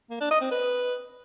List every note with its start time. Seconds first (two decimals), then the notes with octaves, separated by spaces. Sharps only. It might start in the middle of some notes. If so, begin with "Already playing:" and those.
0.10 A#3
0.20 D4
0.31 D#5
0.41 C4
0.51 B4